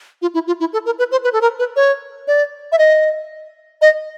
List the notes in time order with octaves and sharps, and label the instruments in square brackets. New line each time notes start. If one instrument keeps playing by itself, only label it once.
[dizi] F4
E4
F4
E4
A4
A#4
B4
C5
B4
A4
A#4
B4
C#5
D5
E5
D#5
D#5